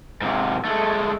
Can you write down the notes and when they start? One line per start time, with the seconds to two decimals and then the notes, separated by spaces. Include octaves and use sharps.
0.21 G#2 C3
0.65 G#3 A3